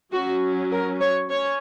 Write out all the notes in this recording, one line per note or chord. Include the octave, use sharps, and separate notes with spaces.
F#3 C#4 F#4
A#4
C#5
C#4 C#5